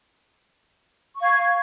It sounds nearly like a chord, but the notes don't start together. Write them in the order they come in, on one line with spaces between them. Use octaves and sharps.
C#6 F5 G#6